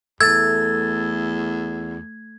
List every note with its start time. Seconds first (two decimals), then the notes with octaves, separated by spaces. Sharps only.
0.21 E2 A3 E6 G#6 A6